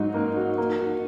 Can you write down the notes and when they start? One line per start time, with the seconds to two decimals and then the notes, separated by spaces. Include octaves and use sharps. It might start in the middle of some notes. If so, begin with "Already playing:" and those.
Already playing: G#2 F#3 D#4 F#4
0.14 A#3
0.37 F#4
0.58 A#3
0.80 F#4